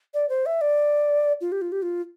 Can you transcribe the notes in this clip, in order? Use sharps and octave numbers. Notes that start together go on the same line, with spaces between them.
D5
C5
E5
D5
F4
G4
F4
G4
F4